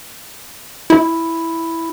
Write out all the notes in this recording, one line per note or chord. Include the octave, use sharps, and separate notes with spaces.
E4